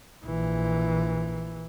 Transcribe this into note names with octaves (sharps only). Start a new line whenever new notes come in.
A#1 E3